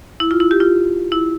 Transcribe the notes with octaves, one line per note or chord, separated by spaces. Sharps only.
E4
F4
E4
G4
F4
E4